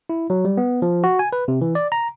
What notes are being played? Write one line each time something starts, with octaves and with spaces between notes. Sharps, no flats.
E4
F#3
G3
B3
F3
F#4
G#5
B4
C3
E3
D5
A#5